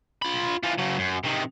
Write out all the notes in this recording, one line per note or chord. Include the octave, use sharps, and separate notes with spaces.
F4 B5
E3 F4
C#3 F#3
F#2
C3 D#3